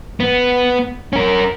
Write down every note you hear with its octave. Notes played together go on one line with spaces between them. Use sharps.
B3
C#4 A#4